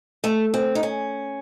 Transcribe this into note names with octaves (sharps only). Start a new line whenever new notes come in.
A3
C4
D#4
C#4